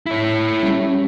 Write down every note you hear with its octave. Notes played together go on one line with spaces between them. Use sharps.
E4 C#5
G3 C#4